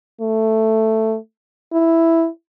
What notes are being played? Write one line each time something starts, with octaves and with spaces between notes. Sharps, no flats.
A3
E4